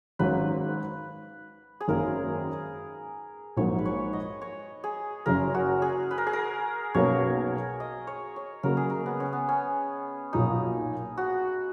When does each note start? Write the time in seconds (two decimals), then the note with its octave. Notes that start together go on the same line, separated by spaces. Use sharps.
0.19 G#1 G#2 F#3 C#4 B4
1.80 G#4
1.88 G#1 F#2 D#3 A#3 A#4
3.57 A#1 G#2 F#3 A#3 C#5
3.78 B4
3.85 C#5
4.13 D#5
4.41 C#5
4.84 G#4
5.26 F#1 F#2 C#3 A#4
5.54 F#4
5.82 G#4
6.11 B4
6.18 A#4
6.27 G#4
6.33 A#4
6.94 B1 B2 A#3 C#4 C#5
7.80 D#5
8.07 C#5
8.36 C#5
8.63 C#3 F#3 A#3 A#4
8.77 G#4
8.90 A#4
9.06 B3
9.20 C#4
9.33 B3
9.49 C#4
10.33 B1 A#2 F#3 D#4
11.17 F#4